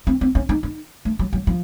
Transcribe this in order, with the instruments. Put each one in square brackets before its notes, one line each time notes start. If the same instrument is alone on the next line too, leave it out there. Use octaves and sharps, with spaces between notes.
[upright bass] C4
C4
C#4
D#4
D#4
A3
F#3
F#3
F3